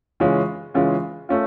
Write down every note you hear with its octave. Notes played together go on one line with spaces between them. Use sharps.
C#3 E3 G#3 C#4 F4
C#3 E3 G#3 C#4 F4
A3 C#4 F4